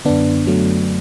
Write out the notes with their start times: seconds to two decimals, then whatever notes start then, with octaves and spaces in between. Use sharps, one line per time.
0.05 F#2 D3 B3 D4
0.47 F#3 A3